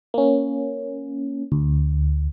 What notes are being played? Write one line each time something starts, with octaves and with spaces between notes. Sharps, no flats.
A#3 C#4
D2